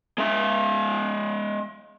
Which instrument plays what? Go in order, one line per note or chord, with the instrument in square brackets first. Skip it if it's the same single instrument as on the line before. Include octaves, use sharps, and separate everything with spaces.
[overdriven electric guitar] G#3 E5